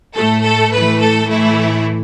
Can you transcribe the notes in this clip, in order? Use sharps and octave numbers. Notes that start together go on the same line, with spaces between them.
A2 A3 A4
A4
A2 E3 A3 B4
A4
A2 E3 A3 E4